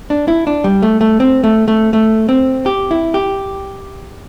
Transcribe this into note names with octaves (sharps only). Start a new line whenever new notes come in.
D4
E4
D4
G3
A3
A3
C4
A3
A3
A3
C4
G4
E4
G4